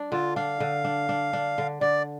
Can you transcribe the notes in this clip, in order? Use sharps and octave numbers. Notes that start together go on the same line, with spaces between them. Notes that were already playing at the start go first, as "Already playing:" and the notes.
Already playing: D4
D3 F4
D4 F5
D3
D4
D4
D4
D3
D3 D5